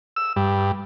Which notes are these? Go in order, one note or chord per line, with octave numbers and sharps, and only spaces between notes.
E6
G2